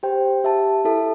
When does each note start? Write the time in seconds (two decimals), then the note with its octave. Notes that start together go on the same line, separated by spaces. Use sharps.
0.03 G4 C5 G5
0.44 G4 E5 A5
0.85 E4 A4 E5 A5